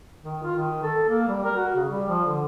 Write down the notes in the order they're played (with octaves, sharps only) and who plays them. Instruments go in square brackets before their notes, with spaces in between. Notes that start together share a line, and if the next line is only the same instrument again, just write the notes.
[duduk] D#3
F4
D#3
A4
A#3
G3
A#4
F#4
C#3
G3
F3
D3